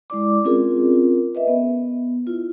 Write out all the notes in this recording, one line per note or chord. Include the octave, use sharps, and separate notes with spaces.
G#3 E4 D5 D6
C4 C#4 F4 G#4 A#4
B4 D#5 E5
B3
E4 F4